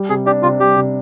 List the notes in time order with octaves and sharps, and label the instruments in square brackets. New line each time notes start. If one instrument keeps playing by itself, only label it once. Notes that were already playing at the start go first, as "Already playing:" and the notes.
Already playing: [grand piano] G3
[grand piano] C3 [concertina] G#4
[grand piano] D4 [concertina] G4
[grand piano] C3 [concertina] F4
[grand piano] G3 [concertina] G4
[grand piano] C3